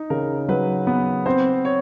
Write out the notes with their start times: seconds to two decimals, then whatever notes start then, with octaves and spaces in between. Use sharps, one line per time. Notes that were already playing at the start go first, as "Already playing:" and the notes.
Already playing: D#4
0.10 C#3 A#4
0.49 F#3 B4
0.87 B3
1.26 C4 C5
1.65 C#5